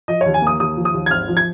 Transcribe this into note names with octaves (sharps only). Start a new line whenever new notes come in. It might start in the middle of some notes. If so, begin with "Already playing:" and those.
F3 D#5
D#2 C#5
G#5
A#3 D#6
D#2 D#6
F3
D#6
D#2
G#6
G#1 F6
F3
G#6